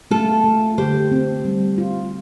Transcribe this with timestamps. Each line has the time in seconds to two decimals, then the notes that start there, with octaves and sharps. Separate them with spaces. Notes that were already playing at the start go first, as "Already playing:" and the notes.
0.11 A3 F4 A4
0.44 A3
0.78 D3 G4 C5
1.11 C4
1.45 G3
1.78 F4